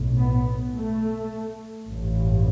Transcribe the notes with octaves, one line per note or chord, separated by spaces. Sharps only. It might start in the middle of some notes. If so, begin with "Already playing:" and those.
Already playing: B1 A2
B3
A3
A1 G2